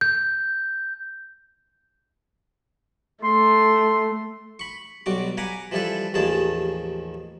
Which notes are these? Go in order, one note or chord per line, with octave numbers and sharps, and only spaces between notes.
G6
A3 C6
B5 C#6
B1 G3 F#4 D6
F#5 G#5 A#5 B5 D6
E3 F3 G3 E4 A4 B4
A1 D#2 D#3 F3 G#4 A5